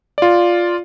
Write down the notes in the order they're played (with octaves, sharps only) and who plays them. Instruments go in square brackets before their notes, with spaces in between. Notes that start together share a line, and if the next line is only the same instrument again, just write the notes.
[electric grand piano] F4 D5